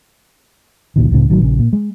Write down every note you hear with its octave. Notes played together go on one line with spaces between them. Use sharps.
C#2 A#2 D#3
C#2 A2 C#3
A1 D#3 F#3
A#1 C#3
A#2
G#3